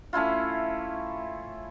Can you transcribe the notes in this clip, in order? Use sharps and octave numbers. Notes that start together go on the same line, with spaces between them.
A3 C#4 E4 F4